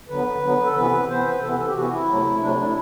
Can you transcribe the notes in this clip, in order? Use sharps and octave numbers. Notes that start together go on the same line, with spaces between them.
D3 F#3 B3 B4
D3 F#3 B3
A4
C3 E3 B3 B4
C3 E3 B3 C5
B4
C3 E3 B3 A4
A4
G4
C3 E3 B3 F#4
E4
C3 F#3 A3
C3 F#3 A3 D4
D4
E4